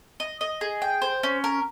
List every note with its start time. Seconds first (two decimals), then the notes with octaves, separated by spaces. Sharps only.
0.20 D#5
0.41 D#5
0.61 G#4
0.82 G5
1.02 C5
1.23 C#4
1.44 A#4